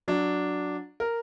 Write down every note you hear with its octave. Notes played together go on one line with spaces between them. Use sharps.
F#3 D4
A#4